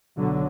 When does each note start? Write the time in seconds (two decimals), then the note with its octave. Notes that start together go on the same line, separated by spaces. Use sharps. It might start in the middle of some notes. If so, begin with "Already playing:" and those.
0.17 B1 D3 F#3